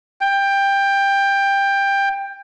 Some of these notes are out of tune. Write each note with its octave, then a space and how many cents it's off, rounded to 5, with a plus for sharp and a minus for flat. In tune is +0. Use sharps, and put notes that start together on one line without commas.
G5 +15